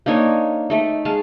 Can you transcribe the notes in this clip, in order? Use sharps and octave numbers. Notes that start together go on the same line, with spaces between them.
A#3 D4 D#4 C#5
A3 D#4
G#3 F5 A5